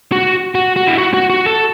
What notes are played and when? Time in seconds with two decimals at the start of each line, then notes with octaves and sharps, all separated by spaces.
0.12 F#4
0.55 F#4
0.76 F#4
0.87 E4
0.98 F#4
1.14 F#4
1.30 F#4
1.46 A4